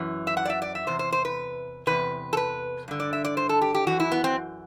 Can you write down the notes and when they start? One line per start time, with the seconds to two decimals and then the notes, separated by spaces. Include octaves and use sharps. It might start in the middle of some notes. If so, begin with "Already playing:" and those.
Already playing: F#2 E3
0.27 E5
0.37 F#5
0.45 D5
0.50 E5
0.62 D5
0.75 E5
0.87 E2 C3 C5
0.99 C5
1.12 C5
1.25 B4
1.87 E2 C3 B4
2.33 A4
2.37 B4
2.88 G2 D3
3.00 D5
3.13 E5
3.24 D5
3.37 C5
3.49 A4
3.62 G4
3.75 G4
3.87 F#2 E3 F#4
4.00 E4
4.12 B3
4.24 C4